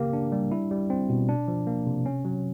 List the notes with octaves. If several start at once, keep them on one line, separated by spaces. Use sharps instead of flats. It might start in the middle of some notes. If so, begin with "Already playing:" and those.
Already playing: C#3 A#3 G4
D4
G3
E4
G3
C4
B2
D4
F3
A#3
C3
C#4
F#3